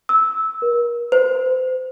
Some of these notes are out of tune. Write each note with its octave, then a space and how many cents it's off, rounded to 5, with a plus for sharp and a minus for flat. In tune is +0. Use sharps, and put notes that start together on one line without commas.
E6 -15
A#4 +35
C5 -30